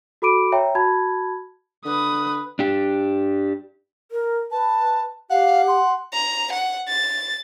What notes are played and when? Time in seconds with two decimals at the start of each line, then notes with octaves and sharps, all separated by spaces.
0.22 F#4 A4 B5 D6 D7 D#7
0.52 C#5 E5 G5 A#5
0.75 F#4 A5 B5 G#6
1.85 D3 B4 D#6
2.59 D4 G4
4.12 A#4
4.51 B4 A5
5.30 G4 F5 F#5
5.68 C6
6.13 A#5
6.53 F#5
6.89 A6